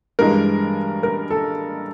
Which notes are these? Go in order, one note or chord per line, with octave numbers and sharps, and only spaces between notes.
G2 E3 G#3 A#4
A#4
A4